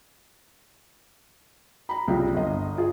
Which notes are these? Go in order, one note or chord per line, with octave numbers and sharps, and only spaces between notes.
A#5 B5
C2 C#3 F4 G5
G1 D#5
F4 G#4